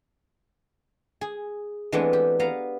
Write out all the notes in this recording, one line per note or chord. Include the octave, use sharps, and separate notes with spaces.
G#4
E3 G#3 A3 B3 C4 D4
G4
B3 F5 A#5